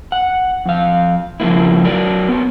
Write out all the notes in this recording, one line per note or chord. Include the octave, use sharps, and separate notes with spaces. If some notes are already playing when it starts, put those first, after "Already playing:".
F#5
F2 F5
F2 C#3 F3 G#3 A#3 E4
F#3 A#4 D5
B3 C#5